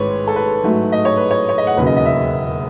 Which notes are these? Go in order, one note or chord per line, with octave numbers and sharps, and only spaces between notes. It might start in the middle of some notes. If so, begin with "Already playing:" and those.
Already playing: A1 G#2 D#3 G#3 B4 C#5
A4
B4
G#2 F#3 A3
D#5
C#5
B4
C#5
C#5
D#5
F#5
E1 D#2 C#3 F#3 B4
D#5
D#5
E5